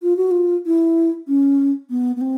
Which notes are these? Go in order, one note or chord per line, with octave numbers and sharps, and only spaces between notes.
F4
F#4
F4
E4
C#4
B3
B3
C4